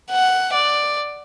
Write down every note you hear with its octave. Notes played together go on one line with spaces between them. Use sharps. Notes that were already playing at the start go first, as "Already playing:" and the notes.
F#5
D5